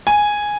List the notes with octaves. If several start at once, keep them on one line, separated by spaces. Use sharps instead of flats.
G#5